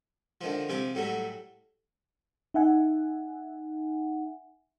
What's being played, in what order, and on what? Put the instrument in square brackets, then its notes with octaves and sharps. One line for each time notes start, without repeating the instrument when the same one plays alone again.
[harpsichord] D3 D#3 F3
C3 F3 G#5 D6
A2 F#3 G3 A3
[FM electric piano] D#4 E5 F#5 G#5